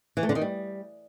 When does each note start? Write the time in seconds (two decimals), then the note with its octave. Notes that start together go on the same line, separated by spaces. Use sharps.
0.17 E3
0.23 A3
0.29 D3
0.35 D#3
0.41 G3